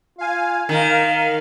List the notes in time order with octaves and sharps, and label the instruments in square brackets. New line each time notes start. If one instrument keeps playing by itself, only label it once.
[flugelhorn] F4 [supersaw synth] F5 G#5
[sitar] D#3 [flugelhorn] A#4 [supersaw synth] F5